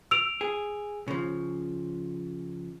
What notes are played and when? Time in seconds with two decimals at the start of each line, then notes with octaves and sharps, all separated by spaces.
0.11 E6 D7 F7
0.41 G#4
1.08 C#3 F3